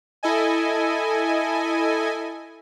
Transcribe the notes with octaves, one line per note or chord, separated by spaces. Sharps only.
E4 A4 D#5 G#5